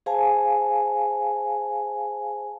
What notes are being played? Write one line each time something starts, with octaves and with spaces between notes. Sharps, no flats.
G#4 C5 F5 G#5 A5